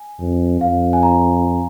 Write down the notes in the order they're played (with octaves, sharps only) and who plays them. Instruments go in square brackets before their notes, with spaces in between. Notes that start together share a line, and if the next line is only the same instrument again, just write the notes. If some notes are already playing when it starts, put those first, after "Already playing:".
Already playing: [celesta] G#5
[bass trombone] F2
[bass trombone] F2 [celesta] F5
[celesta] G#5
A#5